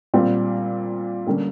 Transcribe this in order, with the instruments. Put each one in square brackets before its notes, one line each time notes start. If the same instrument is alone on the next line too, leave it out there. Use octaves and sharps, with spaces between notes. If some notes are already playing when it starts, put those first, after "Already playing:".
[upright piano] A#2 G3 C4
D3 G3 A#3 C#4